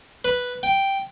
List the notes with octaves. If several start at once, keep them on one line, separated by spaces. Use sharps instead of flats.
B4
G5